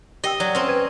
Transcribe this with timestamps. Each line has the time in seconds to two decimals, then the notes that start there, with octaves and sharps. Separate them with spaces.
0.24 G4 D#5 G5 E6
0.40 F#3 D5
0.55 C4 C#4
0.68 B4 G#6 D#7